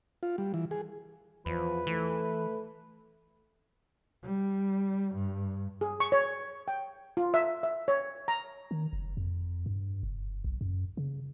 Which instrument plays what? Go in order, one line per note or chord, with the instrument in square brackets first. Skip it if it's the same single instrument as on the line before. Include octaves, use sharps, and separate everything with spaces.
[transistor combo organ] F4
G3
E3
G#4
[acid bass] E2 [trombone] F3 [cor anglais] B4
[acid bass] E3 [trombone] A3
[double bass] G3
G2
[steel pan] G#4
C#6
C#5
G5
F4
E5
E5
C#5
A#5
[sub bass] D#3
F#1
F2
G2
F#1
B1
F#2
C#3